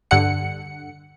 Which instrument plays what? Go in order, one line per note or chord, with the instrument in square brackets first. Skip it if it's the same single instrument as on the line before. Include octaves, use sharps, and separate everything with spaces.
[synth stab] G2 D3 F#5 C#7